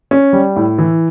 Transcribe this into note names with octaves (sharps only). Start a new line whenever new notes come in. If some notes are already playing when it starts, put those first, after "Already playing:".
C#4
G3
A2
E3